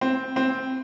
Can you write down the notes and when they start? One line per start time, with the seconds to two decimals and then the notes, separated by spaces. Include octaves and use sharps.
0.01 C4
0.36 C4